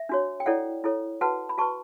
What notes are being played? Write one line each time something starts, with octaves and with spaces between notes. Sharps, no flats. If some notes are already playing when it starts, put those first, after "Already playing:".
Already playing: E5
D4 F#4 C#5
G5
E4 A4 C#5 D5 F#5
E4 A4 C#5
F#4 B4 F#5 A5
B5
F#4 B4 A5 C#6